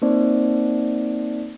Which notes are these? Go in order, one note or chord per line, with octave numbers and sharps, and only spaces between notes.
A#3 C4 D#4 C5 D5